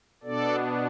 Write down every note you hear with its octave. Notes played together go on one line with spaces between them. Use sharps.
B2 B3 D4 A4 D5